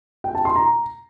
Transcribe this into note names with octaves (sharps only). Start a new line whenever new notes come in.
G5
A5
C6
A#5